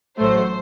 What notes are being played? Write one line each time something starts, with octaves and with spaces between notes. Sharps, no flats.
A1 A2 F#3 A3 C5